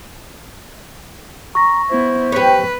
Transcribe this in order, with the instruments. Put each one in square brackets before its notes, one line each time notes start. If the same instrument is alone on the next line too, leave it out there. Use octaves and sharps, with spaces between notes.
[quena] A#5 [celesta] C#6 A#6
[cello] B3 E4 [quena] C5
[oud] G4 C#5 [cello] B4